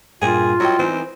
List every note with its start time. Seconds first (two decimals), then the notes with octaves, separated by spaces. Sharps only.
0.22 G2 A#2 F4 G#4
0.60 F#3 E4 D#5 G5
0.79 E3 B3 C4 D#4